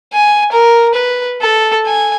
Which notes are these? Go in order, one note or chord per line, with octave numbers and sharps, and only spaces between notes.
G#5
A#4
B4
A4
G#5